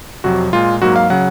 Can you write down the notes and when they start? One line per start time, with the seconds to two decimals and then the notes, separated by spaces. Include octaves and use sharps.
0.24 F2 C3 F#3 F#4
0.53 A#2 G#3 F4
0.82 G#2 F#3 A#3 F#4
0.96 F5
1.10 C#3 F#3 F#5